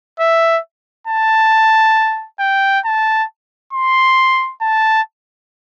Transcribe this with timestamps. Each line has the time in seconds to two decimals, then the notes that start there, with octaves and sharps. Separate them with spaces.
0.20 E5
1.07 A5
2.40 G5
2.85 A5
3.73 C6
4.62 A5